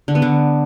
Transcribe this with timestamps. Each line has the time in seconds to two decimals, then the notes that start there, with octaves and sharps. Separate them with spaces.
0.08 D3
0.15 B3
0.22 D3